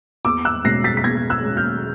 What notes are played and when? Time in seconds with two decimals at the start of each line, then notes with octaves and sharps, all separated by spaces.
0.25 E2 D6 E6
0.45 E6 F#6
0.64 B2 G#3 C#4 A#6 C7
0.84 A6 B6
0.97 B6
1.04 E2 G#6 A#6
1.30 E6 F#6
1.43 B2 G#3 C#4
1.57 F6 G6